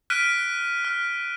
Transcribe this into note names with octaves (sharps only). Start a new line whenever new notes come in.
F6 F#6 B6 D7 D#7
F6